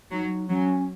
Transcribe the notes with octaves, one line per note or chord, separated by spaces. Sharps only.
F#3 D#4
F#3 C#4